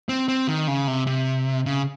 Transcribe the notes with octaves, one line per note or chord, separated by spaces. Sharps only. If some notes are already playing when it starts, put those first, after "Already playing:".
C4
C4
D#3
C#3
C3
C3
C#3